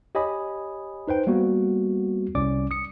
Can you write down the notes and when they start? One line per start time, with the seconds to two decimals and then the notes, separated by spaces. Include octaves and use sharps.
0.15 G4 C#5 D#5 G#5 B5 D#6
1.08 D#4 B4 C5 G5
1.27 G3 A#3 B3 F#4
2.35 C2 C#4 D5 D6
2.71 D#6 C#7